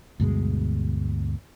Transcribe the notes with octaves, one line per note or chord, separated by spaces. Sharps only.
D2 G2 B2 G#3